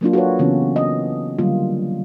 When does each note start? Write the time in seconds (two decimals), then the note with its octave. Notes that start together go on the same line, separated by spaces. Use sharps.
0.01 F#3 A#3 D4 F4
0.13 F#4 A4 B4 C#5
0.39 C#3 E3 B3 C#4
0.76 D#5
1.38 D3 F#3 G3 A#3 F4